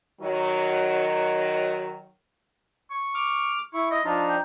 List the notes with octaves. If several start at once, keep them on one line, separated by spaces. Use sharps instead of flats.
D#3 F#3
C#6
D6 F6
E4 C#6
D#5
F3 D4 D#4 F4
G5